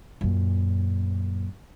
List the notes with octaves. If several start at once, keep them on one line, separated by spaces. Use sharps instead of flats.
F#2 A#2